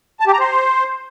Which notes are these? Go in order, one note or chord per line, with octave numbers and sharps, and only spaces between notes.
A5
G4
A#5
C5